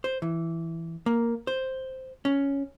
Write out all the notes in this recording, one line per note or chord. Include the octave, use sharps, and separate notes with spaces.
C5
E3
A#3
C5
C#4